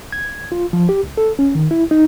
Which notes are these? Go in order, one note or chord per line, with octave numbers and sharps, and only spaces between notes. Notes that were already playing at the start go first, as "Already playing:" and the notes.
G#6
F4
F3
G4
C#2
A4
C#4
D#3
E4
D#4